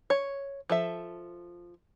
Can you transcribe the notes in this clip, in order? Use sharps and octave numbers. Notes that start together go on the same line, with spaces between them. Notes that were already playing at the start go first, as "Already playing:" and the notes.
C#5
F3 A4 E5